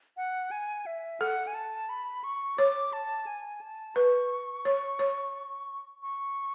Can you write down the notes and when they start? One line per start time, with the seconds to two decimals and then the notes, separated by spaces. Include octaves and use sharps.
0.17 F#5
0.51 G#5
0.86 E5
1.20 A4 F#5
1.47 G#5
1.54 A5
1.89 B5
2.24 C#6
2.58 C#5 D6
2.93 A5
3.27 G#5
3.61 A5
3.95 B4 C#6
4.65 C#5
4.99 C#5
6.03 C#6